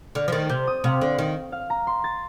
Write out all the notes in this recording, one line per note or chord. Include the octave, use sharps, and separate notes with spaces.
D3 F6
F3
D#3 A6
C3 G6
D#6
C3 F5
D3
D#3
F5
A#5
C6
A6